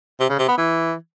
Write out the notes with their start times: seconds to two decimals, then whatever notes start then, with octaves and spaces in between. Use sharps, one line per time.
0.20 C3
0.30 C#3
0.39 C3
0.48 B3
0.58 E3